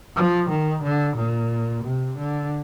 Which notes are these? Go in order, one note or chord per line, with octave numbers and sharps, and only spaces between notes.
F3
D#3
D3
A#2
C3
D3